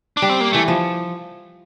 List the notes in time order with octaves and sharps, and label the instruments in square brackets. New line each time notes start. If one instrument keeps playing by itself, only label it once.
[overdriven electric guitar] D4
[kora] G3
[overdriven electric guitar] C4
A#3
[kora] E3 [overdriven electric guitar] A3
[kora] F3